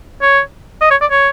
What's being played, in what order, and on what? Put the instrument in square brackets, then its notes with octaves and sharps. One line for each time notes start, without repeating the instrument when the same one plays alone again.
[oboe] C#5
D#5
C#5
D5
C#5